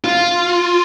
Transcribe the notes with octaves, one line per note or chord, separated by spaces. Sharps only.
F4